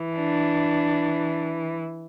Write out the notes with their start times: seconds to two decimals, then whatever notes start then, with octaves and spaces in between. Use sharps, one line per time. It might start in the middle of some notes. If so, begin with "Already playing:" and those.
Already playing: E3
0.17 D4